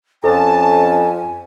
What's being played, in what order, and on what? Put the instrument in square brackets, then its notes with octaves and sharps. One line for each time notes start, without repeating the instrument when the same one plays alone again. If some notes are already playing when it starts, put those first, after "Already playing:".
[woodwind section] F2 [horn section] C#4 A5 [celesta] A4 [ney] G#5